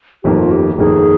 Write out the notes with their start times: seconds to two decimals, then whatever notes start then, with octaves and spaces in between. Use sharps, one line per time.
0.24 G1 F2 D#3 A#3 G4
0.38 F4
0.51 G4
0.74 G4
0.78 G1 F2 D#3 A#3 G#4